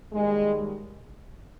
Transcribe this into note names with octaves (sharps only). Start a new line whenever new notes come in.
D#2 D#3 G3 G#3